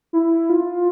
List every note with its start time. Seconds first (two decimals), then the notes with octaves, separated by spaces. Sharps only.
0.13 E4
0.50 F4